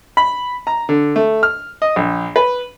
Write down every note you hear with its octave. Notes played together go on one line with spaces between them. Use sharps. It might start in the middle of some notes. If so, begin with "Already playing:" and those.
B5
A#5
D3
A3
F6
D#5
A#1
B4